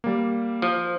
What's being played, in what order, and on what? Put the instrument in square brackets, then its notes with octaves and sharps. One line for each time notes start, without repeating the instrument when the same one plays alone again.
[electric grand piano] G3 A#3
[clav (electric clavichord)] F3